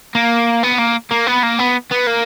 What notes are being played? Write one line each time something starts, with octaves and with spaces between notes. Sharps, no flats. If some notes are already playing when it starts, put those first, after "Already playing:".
A#3
B3
A#3
A#3
B3
A#3
B3
B3
A#3